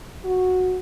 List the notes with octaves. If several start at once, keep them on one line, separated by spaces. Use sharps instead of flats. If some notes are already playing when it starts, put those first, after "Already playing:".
F#4